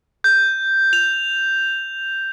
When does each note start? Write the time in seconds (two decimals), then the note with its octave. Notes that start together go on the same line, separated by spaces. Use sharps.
0.24 G6
0.93 F7